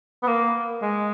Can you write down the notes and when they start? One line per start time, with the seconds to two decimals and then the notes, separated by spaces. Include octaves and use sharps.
0.23 B3
0.27 A#3
0.82 G#3